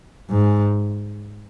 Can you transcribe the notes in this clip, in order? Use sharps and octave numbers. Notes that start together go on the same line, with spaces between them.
G#2